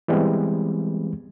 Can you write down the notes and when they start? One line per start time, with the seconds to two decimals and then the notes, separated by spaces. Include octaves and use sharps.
0.08 E3 G3 G#3 B3 C4